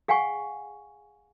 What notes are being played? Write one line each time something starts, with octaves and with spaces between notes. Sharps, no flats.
G#4 F5 F#5 G#5 C#6